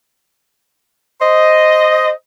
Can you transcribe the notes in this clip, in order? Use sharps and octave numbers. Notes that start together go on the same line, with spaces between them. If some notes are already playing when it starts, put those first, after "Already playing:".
C5 D#5